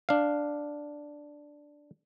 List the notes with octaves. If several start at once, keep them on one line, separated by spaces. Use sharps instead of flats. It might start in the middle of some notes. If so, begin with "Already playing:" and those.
D4 F5